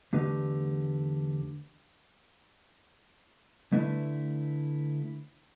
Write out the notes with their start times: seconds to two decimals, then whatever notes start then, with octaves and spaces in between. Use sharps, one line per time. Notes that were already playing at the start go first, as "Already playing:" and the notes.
0.13 E2 D3 A3 G4 B4
3.72 D3 A3 E4 B4